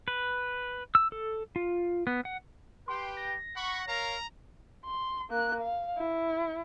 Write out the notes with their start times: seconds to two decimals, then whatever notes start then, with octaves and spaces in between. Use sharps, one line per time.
0.08 B4
0.95 E6
1.12 A4
1.56 F4
2.07 B3
2.25 F#5
2.88 G4 B4 G5 C6
3.17 A#6
3.56 F#5 B5 C#6
3.88 A#4 C#5 F5 A#5
4.85 C6
5.30 A#3 F#6
5.61 F5
5.98 E4